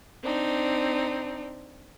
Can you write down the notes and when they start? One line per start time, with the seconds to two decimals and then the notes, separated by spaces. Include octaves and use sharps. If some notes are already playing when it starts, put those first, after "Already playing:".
0.23 C4 D4 D#4